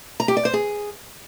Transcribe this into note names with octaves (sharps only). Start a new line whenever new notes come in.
A#5
G4
D5
C5
G#4